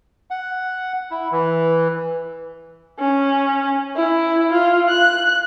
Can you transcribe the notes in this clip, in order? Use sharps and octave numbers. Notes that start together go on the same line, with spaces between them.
F#5
E4
E3
C#4
E4
F4
F#6